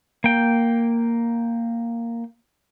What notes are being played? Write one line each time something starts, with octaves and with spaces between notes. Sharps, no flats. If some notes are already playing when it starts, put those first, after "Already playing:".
A#3 G5